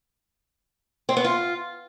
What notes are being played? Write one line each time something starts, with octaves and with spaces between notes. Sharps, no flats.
C4
B3
F4